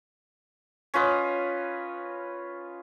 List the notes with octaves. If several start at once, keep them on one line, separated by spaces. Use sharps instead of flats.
C#4 F4 B4 D#5